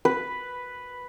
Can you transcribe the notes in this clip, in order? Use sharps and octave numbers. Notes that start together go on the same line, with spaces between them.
B4